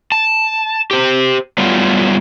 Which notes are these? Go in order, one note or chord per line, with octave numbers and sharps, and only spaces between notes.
A5
G4 C5
F#3 G3 A3 B3 F4